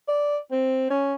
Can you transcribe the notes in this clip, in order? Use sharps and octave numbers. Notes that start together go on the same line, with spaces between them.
D5
C4
C#4